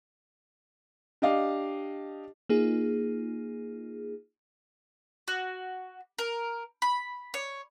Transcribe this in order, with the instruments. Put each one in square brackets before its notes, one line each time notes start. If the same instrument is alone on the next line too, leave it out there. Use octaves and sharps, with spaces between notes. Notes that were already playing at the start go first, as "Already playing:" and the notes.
[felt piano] D4 G4 D#5 F5
[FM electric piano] A#3 D#4 F4 G#4
[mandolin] F#4
A#4
B5
C#5